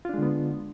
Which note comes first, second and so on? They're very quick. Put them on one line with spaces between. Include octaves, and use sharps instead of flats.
F4 D4 G#3 D3 B3